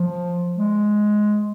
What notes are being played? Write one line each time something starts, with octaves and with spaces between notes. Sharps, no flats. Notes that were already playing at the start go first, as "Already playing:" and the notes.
Already playing: F3
G#3